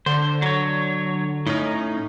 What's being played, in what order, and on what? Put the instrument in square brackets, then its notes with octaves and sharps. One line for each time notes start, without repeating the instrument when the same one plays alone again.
[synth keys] D3 [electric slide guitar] C5
[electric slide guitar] F#3 C#5
[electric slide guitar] A2 C#4 [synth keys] D#4